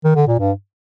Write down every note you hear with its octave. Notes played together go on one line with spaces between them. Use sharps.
D#3
D3
A#2
G2